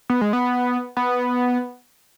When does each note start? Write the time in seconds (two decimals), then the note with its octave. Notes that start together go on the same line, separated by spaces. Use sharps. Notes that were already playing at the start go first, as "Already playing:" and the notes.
0.10 B3
0.21 G#3
0.33 B3
0.97 B3